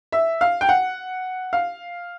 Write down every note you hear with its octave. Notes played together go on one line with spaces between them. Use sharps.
E5
F5
G5
F#5
F5